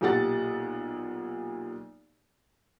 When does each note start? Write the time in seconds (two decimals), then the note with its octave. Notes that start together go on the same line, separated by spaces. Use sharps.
0.01 B1 A#2 G4 F#5 A6